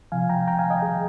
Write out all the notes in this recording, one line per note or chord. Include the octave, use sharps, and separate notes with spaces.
C3 F3 F5 G#5
G5 A#5
G5 A#5
F5 G#5
D#5 G5
G#4